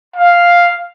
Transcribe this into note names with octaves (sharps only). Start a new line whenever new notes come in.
F5